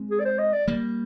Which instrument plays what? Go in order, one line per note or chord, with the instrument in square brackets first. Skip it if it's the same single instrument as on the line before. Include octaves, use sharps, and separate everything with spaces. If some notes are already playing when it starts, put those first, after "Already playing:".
Already playing: [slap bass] G#3 C4
[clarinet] G#4
D5
C5
D#5
D5
[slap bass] G3 A#3